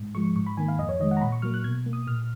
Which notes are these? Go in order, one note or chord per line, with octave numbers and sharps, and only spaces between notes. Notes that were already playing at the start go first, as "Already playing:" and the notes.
Already playing: G#2
F3 G#3 C#6
G#2 C#6
B5
D#3 A#3 G#5
F5
F2 D#5
C#5
D#3 G#3 D#5
F#5
A#5
A#2 B5
C#6
F#3 A#3 F6
F#6
B2 G#6
A#3
D#6
A#2 F6